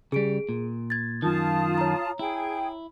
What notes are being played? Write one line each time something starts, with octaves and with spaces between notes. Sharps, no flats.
C#3 G3 G#4 D7
A#2
G#6 A6
F#2 D#3 F4 A5 D#6
C#5 A#5
E4 G#4 G5